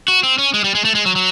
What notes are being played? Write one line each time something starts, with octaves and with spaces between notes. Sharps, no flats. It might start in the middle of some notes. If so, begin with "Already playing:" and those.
F#4
C4
C#4
G#3
G3
G#3
A3
G#3
F#3
F#3